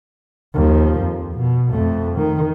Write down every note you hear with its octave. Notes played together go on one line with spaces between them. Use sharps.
D#2 F3
F2
B2
F2 A3
D#3